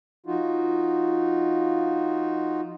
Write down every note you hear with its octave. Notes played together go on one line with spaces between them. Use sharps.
F3 D#4 F4 F#4